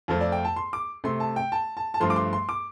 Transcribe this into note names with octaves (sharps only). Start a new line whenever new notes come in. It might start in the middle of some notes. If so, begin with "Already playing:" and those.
F2 F3 A3 A4
D5
G5
A5
C6
D6
C3 A3 C6
A5
G5
A5
A5
A5
G2 F3 A3 C6
D6
C6
C6
D6